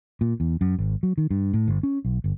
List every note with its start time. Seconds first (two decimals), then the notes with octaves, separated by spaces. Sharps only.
0.21 A#2
0.40 E2
0.61 F#2
0.78 G#1
1.03 F#3
1.18 D#3
1.31 G2
1.53 A2
1.68 G1
1.83 C#4
2.05 B1
2.24 G1